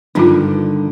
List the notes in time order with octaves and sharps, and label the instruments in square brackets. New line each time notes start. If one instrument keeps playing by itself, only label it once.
[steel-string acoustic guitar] G2 D3 D#3 [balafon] D4 D#4 F4